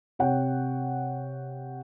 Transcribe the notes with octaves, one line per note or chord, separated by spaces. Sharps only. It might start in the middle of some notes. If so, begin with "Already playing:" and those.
C3 C#5 F#5 G5